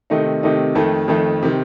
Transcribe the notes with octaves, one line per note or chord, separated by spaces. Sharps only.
C3 D#3 A3 D#4
C3 D#3 A3 D#4
F2 D#3 A3
F2 D#3 A3
C3 D#3